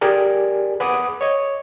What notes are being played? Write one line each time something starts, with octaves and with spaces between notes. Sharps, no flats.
G4 G#4 A#4 D5 G#5
G#4 B4 F#5 B5 D6 D#6
C#5 D#5